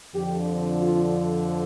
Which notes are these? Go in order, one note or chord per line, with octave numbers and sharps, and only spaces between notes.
F2 D3 F3 G4
F4